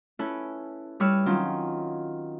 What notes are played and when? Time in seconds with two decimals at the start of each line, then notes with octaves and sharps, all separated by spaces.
0.19 C#4 E4 A4 B4
1.00 G3 E4 B4 C#5 E6 F6
1.26 D#3 F#3 C4 C#4 D#4 F4